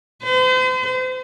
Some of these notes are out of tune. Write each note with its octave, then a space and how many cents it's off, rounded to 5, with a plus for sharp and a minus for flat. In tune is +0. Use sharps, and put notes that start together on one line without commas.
C5 -40